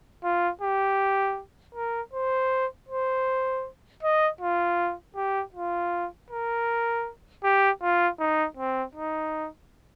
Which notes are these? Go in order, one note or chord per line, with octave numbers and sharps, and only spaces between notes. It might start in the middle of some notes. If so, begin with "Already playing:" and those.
F4
G4
A#4
C5
C5
D#5
F4
G4
F4
A#4
G4
F4
D#4
C4
D#4